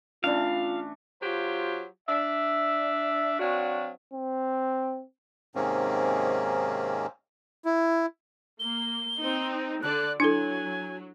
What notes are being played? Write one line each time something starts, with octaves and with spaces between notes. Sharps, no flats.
E3 A3 C#4 D4 F4 D5 F5
F#3 F4 G4 C5
D4 E5
F#3 C4 D4 F#4 F5
C4
G#2 C3 D#3 A#3 C4 C#4
E4
A#3 G7
C4 D#4
D3 D5 F#6
F#3 D4 E4 A4 G#5